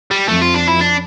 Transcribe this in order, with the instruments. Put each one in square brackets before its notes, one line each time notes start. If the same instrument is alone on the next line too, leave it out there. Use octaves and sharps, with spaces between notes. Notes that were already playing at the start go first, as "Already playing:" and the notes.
[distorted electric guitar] G3
[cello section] F2 F3 [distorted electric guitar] A3
[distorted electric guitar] F4
D4
E4
D4